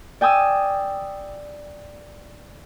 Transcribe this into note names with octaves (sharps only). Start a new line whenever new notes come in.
D5 G5 G#5 D#6 E6